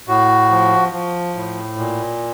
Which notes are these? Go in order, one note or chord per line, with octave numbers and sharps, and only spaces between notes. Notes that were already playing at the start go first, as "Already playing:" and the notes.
A2 F#4
F3
F3
A2
A#2